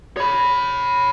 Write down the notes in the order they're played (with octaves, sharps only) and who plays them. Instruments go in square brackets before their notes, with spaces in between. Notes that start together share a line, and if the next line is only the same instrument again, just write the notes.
[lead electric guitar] C#5 B5